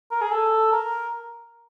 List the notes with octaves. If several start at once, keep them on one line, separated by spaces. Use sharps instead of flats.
A#4
G#4
A4
A#4